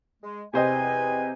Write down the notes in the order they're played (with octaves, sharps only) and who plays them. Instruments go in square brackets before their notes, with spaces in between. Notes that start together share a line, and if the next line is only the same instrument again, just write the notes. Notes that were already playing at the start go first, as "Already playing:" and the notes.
[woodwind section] G#3
[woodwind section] E2 B4 G#5 [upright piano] C3 C5 D#5